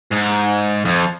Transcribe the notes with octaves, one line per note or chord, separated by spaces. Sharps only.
G#2
F2